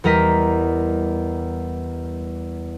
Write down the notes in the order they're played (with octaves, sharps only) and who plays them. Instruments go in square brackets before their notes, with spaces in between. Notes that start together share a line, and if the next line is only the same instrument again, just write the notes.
[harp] E2 G3 A#4 D#5 B6